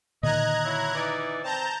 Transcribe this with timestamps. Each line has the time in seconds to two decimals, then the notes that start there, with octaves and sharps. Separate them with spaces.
0.23 A#2 D3 D#3 D#5 A#5 F#6 G#6
0.65 F#3 E4
0.95 E3 D#4 D5
1.44 C4 A5 A#5 G6